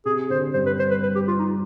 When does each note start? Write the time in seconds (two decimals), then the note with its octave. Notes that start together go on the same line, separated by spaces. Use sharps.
0.05 C3 G#4
0.30 D3 C5
0.54 G2 C5
0.66 B4
0.79 C5
0.91 B4
1.03 B4
1.15 G4
1.28 F4
1.39 D#4